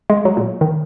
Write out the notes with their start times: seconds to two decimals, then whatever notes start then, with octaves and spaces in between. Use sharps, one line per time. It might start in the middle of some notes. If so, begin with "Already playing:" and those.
0.10 G#3
0.25 F#3
0.37 A#2
0.61 D#3